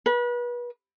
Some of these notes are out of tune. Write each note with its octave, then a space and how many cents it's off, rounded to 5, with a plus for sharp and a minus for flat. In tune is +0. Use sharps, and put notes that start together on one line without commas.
B4 -35